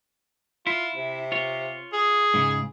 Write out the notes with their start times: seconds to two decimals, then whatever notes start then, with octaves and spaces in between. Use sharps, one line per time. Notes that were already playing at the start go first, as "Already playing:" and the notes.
0.67 E4 F4
0.96 C3
1.32 F4 C#5
1.93 G#4
2.34 G#2 C#3